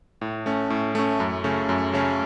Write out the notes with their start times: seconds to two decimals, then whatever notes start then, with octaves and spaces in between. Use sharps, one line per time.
0.21 A2
0.46 A3 C#4
0.70 A2
0.95 A3 C#4
1.20 F#2
1.44 C#3 A3 C#4
1.69 F#2
1.93 C#3 A3 C#4